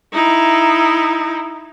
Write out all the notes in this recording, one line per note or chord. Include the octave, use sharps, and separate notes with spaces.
D#4 E4